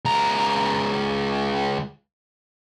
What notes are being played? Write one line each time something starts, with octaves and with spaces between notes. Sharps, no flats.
C#2 A#5